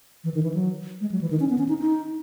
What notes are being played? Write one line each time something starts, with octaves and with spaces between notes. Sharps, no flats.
E3
D#3
E3
F#3
G#3
F#3
E3
D#3
C#4
B3
C#4
D#4
D#4